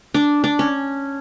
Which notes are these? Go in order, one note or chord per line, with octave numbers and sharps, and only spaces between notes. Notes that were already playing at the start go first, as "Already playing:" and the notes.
D4
D4
C#4